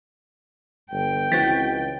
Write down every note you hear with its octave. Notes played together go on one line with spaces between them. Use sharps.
G1 G5
C#2 E3 C4 F#4 A6 B6